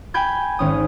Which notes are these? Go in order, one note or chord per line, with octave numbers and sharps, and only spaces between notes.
G5 G#5 B5 G6 G#6
G#1 C#4 D#6